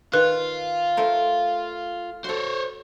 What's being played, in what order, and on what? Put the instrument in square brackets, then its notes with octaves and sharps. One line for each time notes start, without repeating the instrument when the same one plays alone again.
[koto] D#3 [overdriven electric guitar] F4 [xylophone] B4 F#6
[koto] A3 A#4 C5
[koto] F#4 A4 [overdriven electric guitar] C5 C#5